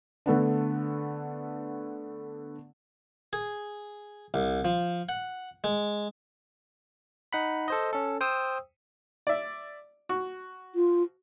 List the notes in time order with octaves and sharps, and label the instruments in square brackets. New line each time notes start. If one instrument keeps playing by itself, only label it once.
[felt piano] D3 A3 B3 D4
[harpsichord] G#4
C2
F3
F#5
G#3
[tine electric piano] D#4 F#5 B5
A4 C5 D#5
C#4 A4
C5 G5 D#6 E6
[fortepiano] D5 E5
F#4
[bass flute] F4